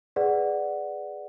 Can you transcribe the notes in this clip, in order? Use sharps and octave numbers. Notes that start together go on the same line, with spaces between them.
G#4 B4 D5 F#5